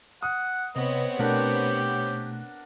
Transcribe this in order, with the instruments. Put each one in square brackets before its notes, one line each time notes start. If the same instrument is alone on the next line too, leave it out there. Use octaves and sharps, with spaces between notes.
[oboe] F#5 [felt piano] D#6
[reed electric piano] C3 B4 [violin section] B3 C4 C#5 [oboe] D#5
[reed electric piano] B2 A3 [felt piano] D4 A#4 F#5 [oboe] G4